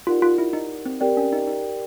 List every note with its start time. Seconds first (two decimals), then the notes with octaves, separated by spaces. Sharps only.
0.07 D#4 F4 G4 A#4 D5 F#5
0.22 F4
0.38 E4
0.53 D#4
0.86 C4
1.00 C4 G4 A#4 D5 G5
1.17 C#4
1.33 D#4
1.47 D#4